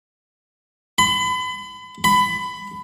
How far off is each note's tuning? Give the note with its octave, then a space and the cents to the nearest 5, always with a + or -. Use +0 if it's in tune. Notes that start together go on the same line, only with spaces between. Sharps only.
B5 +35
B5 +20